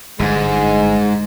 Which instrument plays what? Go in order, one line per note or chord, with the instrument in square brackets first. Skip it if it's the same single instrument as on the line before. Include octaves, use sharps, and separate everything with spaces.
[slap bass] G1 D3 [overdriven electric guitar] G#2 [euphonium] G#3